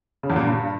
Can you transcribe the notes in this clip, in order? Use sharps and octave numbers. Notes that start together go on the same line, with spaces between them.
C#3
E2
A#2
G2